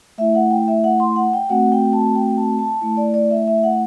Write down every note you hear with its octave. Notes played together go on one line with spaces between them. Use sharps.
A3 E4 E5
F#5
G5
E5
F#5
C6
F#5
G5
A3 C4 F#4 F#5
G5
A5
G5
A5
A5
A3 E4 A5
D5
D5
E5
E5
F#5